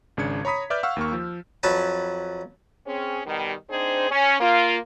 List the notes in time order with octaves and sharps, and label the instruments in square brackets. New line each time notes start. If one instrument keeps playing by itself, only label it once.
[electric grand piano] G#1 C#3 D4 G#6 C#7
C#5 A#5 B5 D#6 B6
B4 D5 E5 D6 F6 G6
F5 F#5 C#6 E6 F6
D#2 A#3 C#6
F3
[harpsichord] F2 F#3 B4 A5
[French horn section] C4 C#4 G#4
B2 D#3 G3
C4 D4 D#4 G#4 C5
C#4
A#3 F4